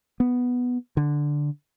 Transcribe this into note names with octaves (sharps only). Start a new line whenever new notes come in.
B3
D3